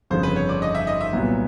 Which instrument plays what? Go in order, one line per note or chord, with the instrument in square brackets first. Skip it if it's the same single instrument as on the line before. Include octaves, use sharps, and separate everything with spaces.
[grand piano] G1 F2 C#3 [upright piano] C5
[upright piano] B4
C#5
D5
D#5
E5
D#5
E5
[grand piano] C2 A#2 F#3 B3